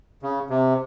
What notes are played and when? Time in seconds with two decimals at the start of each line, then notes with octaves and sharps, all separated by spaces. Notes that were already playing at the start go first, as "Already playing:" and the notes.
0.22 C#3
0.50 C3